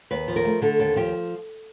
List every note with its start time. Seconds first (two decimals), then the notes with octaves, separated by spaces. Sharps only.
0.11 D#2 B4
0.28 F3
0.36 A#4
0.45 A3
0.62 D3 A4
0.80 D#2 A4
0.96 F3 G4